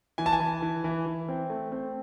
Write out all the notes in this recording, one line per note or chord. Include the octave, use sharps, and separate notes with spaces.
E3 G#5
A5
G#5
E3
E3
E3
E3
C4
A3
C4